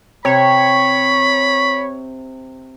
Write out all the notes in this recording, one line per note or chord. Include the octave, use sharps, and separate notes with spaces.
C3 C#5 B5